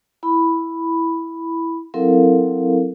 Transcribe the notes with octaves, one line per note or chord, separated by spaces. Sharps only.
E4 B5
F#3 C4 E4 A4 A#4 F5